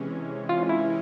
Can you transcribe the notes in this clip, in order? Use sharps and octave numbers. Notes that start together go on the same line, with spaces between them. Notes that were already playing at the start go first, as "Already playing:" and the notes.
Already playing: C3 E3 G#3 C#4
F4
E4